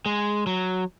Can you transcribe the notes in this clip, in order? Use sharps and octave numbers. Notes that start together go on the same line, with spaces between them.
G#3
F#3